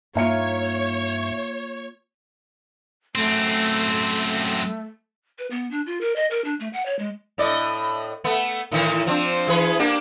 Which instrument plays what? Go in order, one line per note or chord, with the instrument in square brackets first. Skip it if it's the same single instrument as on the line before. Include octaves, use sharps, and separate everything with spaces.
[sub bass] G2 [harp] A#3 F4 [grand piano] D#4 E5 C#7 [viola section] C#5
[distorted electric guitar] F#2 C4 [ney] A3
[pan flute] B4
B3
D4
F4
A#4
D#5
A#4
D4
A3
F#5
C#5
G#3
[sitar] A2 D5 D#5
A3 B3
A2 D#3 E3
F3 C4 D4
E3 G#4 B4
A#3 D4 G4